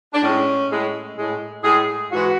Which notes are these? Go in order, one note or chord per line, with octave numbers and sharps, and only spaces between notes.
D4
A2 G#3 C#4
A2 G#3
A2 G#3
A2 G#3 G#4
G#2 E3 G#3 F#4